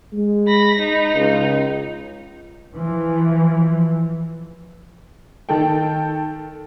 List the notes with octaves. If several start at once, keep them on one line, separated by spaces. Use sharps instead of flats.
G#3
B5 A#6
D#4
C#2
E3 F3
D#3 A4 G5